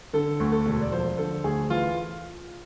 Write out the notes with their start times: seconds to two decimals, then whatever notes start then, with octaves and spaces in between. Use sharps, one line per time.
0.13 D3 A4
0.40 D2
0.52 A4
0.66 E1
0.82 D5
0.92 F3 C5
1.17 D3 A4
1.44 D2 G#4
1.70 E3 F4